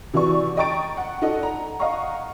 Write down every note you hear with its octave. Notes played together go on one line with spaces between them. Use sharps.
C3 E3 F#4 D5 C#6
D#5 G5 A#5 C#6 A6 D7
F#5
D#4 A4 D5 D#5 F#5
A#5
D#5 F5 F#5 A#5 C#6